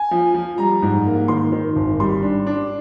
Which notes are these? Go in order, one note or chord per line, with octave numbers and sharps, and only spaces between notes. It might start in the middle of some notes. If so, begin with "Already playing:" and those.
Already playing: G#5
F3
F3
G3 A#5
G#2
A#3
D#3 C6
D#3
G#1
G3 C6
D4
D4